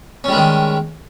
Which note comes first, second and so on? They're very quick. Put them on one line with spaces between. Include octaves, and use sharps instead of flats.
C#4 G3 G#3 D#3